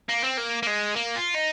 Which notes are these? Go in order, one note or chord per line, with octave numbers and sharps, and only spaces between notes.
A#3
C4
A#3
A#3
G#3
A#3
F4
D#4